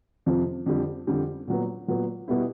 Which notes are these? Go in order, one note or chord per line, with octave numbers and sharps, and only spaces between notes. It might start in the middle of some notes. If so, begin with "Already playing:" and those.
F2 C3 F3
F2 D3 G3
F2 D3 G3
A#2 F#3 B3
A#2 F#3 B3
B2 G3 B3 E4